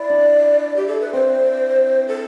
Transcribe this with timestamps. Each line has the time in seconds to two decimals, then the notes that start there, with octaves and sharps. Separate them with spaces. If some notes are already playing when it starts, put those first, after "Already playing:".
Already playing: E4 D5
0.10 D4
0.76 G4
0.88 A4
1.01 B4
1.13 C4 C5
2.08 A4